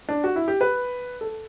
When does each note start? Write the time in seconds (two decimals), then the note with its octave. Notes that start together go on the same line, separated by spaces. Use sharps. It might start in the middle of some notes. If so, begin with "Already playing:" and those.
0.09 D4
0.24 F#4
0.36 E4
0.48 G4
0.61 B4
1.21 A4